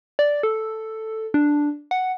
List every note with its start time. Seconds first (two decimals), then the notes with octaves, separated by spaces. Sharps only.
0.19 D5
0.43 A4
1.34 D4
1.91 F#5